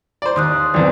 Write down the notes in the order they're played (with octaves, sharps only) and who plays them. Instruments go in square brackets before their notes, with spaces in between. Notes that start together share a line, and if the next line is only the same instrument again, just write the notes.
[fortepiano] C5 D5
[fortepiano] D#2 [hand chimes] C6 D#6 F#6
[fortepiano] B1 E2 C4 [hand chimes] D5